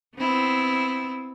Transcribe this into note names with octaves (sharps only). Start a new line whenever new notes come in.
B3 C4 E4